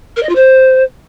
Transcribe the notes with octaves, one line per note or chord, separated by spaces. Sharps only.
A#4
D#5
F4
C5